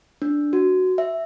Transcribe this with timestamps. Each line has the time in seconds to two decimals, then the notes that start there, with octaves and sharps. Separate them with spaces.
0.22 D4
0.53 F#4
0.98 E5